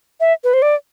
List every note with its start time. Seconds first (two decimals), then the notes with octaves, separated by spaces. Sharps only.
0.20 E5
0.44 B4
0.54 C5
0.62 D5